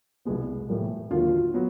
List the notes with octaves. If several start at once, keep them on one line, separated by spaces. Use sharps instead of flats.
C2 B2 G#3 B3
A2 E3 G3 A#3
D#2 D3 F#3 F4
F#3 B3